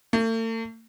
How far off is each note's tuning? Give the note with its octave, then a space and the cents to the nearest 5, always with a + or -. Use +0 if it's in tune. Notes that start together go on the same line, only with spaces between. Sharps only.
A3 +45